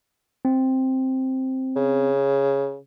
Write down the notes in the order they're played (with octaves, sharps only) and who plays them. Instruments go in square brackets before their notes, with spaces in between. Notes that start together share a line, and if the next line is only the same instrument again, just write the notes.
[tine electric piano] C4
[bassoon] C#3